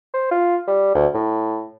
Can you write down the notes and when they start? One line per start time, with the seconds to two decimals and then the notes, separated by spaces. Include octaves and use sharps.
0.14 C5
0.31 F4
0.67 G3
0.95 D2
1.14 A2